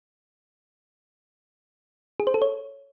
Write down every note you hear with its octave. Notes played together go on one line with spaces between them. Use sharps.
G#4
C5
A4
C#5